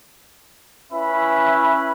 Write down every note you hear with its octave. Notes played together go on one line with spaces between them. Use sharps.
C#4 E4 B4 E5 B5